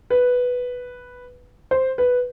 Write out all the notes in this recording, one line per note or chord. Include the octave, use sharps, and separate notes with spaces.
B4
C5
B4